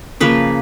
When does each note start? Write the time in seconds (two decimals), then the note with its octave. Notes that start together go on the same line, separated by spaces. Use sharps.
0.20 C#3 F3 A#3 B4